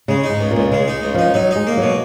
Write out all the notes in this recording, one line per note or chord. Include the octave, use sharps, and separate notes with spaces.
C#3 G#3
D#4
G#2
C#2
A#2
C#2
C#3 G#3
D#4
C#2
F3 D#4
F#3 D#4
G#3 D#4
A#3
B2 F#3